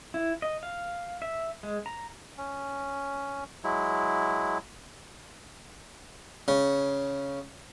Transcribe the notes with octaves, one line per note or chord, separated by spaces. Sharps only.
E4
D#5
F5
E5
G#3
A#5
C#4
F#3 G#3 E4
C#3